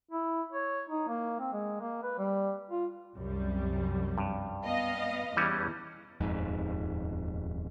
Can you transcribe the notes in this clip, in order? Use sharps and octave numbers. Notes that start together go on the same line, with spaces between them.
E4
C#5
D#4
A#3
C4
G#3
A#3
B4
G3
F4
C2 F#2 G3
G2
B3 D#5 F5
E2 E3 G3 C#4
D#1 F2 G#2